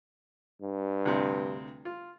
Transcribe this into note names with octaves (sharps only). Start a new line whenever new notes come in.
G2
D2 C3
F4